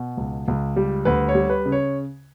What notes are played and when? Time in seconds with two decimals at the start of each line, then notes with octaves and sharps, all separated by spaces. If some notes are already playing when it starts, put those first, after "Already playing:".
Already playing: B2
0.17 C#2
0.48 C#2
0.76 G3
1.05 D2 B4
1.29 C#5
1.35 G3
1.50 B4
1.65 C#3
1.72 C#5